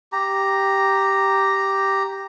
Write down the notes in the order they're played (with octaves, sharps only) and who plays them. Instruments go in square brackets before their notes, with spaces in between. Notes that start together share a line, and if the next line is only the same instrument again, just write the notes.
[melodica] G4 A#5